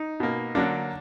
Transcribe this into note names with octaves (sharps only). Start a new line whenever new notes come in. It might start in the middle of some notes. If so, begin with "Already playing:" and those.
Already playing: D#4
B2 A#3
D3 F#3 A#3 D4